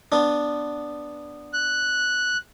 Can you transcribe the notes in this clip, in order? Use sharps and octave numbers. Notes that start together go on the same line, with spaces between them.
B3 D4
F#6